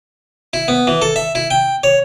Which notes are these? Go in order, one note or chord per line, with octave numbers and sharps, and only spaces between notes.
E4
B3
E3
A4
E5
E4
G5
C#5